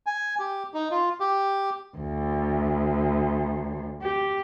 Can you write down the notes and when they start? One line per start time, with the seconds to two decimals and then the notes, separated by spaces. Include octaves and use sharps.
0.06 G#5
0.39 G4
0.74 D#4
0.91 F4
1.20 G4
1.98 D2
4.02 G4